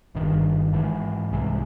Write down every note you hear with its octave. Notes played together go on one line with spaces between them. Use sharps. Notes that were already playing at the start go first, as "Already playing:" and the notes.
G1 G2 D#3
G#2 E3 G#3
C2 C3 E3 G#3